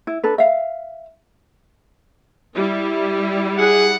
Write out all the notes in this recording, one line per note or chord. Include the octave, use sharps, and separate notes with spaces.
E4
D4 A4 B4
E5 F5
G3 E4
G#4 F#5